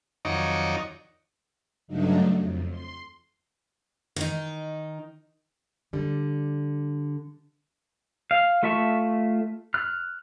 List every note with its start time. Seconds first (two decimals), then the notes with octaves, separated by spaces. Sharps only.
0.25 F2 D#3 F#3 D#4 C#5 D5
1.88 G2 C#3 F#3 A3 D4 D#4
2.39 F2
2.70 C6
4.16 D#3 D#4
5.93 D3 G3
8.31 F5
8.63 A3 F4 E5 A5 C#6
9.74 F6 F#6